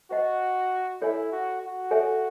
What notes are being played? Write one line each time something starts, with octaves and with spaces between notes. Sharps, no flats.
F#4 C5 D#5 F#5
E4 A4 C#5 E5 G#5
F#4
F#4
A4 C#5 E5 G#5